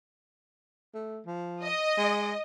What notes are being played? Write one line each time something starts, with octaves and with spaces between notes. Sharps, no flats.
A3
F3
D#5
G#3